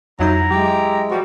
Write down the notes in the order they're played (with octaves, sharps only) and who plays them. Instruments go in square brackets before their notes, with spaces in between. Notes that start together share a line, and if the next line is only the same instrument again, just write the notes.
[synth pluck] F2 D#4 G6 [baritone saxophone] F#3 [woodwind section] E4 A#5
[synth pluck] F#3 [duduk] G#3 [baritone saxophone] G4
[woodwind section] C3 F3 G3 [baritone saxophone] F#4